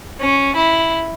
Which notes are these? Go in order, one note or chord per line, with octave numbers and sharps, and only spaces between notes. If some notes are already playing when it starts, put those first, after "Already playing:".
C#4
E4